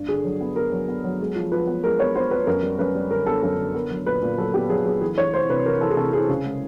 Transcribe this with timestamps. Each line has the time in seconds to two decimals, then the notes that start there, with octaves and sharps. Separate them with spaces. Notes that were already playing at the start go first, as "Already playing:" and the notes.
Already playing: G2
0.08 D3 G#4
0.24 F#3
0.41 B3
0.56 B3 A#4
0.72 F#3
0.88 B3
1.04 F#3
1.20 G#3
1.36 F3
1.52 F3 B4
1.67 B3
1.83 G#3 A#4
1.99 B3 C#5
2.15 B3 C5
2.31 B3 B4
2.47 F#2 A#4
2.63 G3
2.79 F#2 B4
2.95 G3
3.11 D3 A#4
3.26 B3 A4
3.43 F#2 A4
3.58 D3
3.75 B3 A#4
3.91 F#3
4.06 A#2 B4
4.22 A#2
4.38 F#3 A4
4.54 B3 G4
4.70 F#3 G#4
4.86 F#3 G#4
5.02 E3 G#4
5.17 E3 C#5
5.33 C2 C5
5.49 C3 B4
5.65 E3 A#4
5.81 E3 A4
5.90 G#4
5.97 C3 A4
6.13 C2 G#4
6.29 C#3 G#4
6.44 G#3